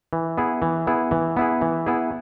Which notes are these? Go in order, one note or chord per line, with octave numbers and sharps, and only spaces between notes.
E3
B3 E4 G#4
E3
B3 E4 G#4
E3
B3 E4 G#4
E3
B3 E4 G#4